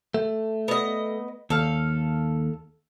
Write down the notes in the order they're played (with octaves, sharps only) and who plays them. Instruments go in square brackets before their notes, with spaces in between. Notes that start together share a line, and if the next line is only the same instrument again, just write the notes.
[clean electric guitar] A3
[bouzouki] B3 D#5
[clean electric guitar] D#2 [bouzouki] A4 F5